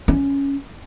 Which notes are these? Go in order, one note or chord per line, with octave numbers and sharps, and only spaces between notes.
C#4